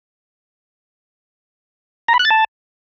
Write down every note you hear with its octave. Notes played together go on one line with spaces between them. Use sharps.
A#5
B5
F#6
A6
A5